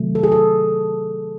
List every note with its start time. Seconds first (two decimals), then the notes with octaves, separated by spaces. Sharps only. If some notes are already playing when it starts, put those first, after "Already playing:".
Already playing: C3 D#3 F#3 A3
0.15 A4
0.23 G#4
0.32 A4